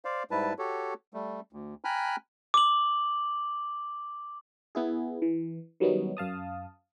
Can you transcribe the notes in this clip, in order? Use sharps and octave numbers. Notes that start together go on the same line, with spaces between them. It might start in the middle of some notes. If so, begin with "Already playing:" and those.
C5 D5 F5
G#2 G3 E4 B4 A5
F#4 G4 A4 C#5
G3 A3
D2
G5 G#5 A#5 B5 F6 F#6
D6 F#7
B3 E4 G#4
E3
D#3 F#3 G3 B3 C#4 D#4
F#2 F5 A5 D#6